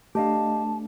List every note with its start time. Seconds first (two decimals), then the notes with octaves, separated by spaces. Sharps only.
0.15 A3 D4 G4 D#5 F5 A5